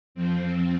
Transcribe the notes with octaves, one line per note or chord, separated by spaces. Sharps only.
F2 F3 C4